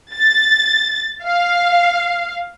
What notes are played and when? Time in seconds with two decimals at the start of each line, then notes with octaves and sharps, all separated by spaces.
0.14 A6
1.24 F5